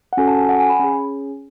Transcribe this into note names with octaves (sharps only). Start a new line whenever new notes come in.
F#5
C#4 F#4 A4 G#5
A5
G#5
F#5
G#5
B5
C#4 G#4